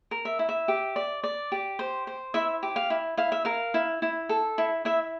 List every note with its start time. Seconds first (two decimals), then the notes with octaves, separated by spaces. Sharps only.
0.11 A#4
0.25 E5
0.39 E4
0.49 E5
0.68 G4
0.96 D5
1.24 D5
1.52 G4
1.79 C5
2.07 C5
2.34 E4 E5
2.63 G4
2.76 F5
2.90 E4
3.17 E4 F5
3.32 E5
3.45 A#4 F5
3.74 E4
4.02 E4
4.29 A4
4.58 E4
4.85 E4 E5